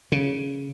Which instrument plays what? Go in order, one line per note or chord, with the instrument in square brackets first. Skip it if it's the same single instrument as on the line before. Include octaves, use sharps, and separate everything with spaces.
[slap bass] C#3